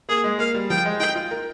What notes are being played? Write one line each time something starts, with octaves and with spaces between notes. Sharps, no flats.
A#3 G#4
G#3
A#3 F5
G3
F3 G5
G#3
D#4 G5
F4
A#4